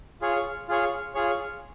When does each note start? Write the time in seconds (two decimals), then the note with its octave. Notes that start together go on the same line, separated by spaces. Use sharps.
0.21 F4 G#4 C#5
0.68 F4 G#4 C#5
1.15 F4 G#4 C#5